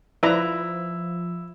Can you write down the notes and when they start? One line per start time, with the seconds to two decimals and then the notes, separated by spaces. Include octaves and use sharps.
0.23 F3 E4 B4 D5 A#5